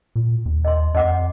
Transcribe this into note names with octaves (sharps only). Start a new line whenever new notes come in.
A#2
D#2
D#5 C6
F2 D#5 F#5 D6